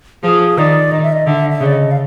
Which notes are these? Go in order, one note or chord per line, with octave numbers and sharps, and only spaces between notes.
F3 G#4
D#3 D5
D#3 D#5
E5
D#5
D3 E5
E5
C#3
D5
D#5
F5